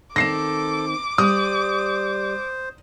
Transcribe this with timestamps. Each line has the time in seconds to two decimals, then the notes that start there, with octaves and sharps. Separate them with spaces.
0.16 D#3 C4 A4 D6 A#6 C7 E7
1.18 G3 C5 D#6